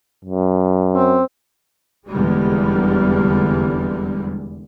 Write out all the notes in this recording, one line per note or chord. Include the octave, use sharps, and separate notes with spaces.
F#2
C4
F1 E2 D3 G3 G#3